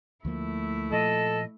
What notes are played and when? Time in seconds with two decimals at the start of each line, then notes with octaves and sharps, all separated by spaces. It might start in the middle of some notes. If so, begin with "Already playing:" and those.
0.25 D2 F3 A3 A#3 E4
0.91 A#2 F3 A4 D#5